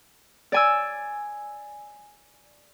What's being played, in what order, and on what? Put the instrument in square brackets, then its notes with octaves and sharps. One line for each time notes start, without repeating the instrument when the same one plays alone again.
[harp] D5 G#5 E6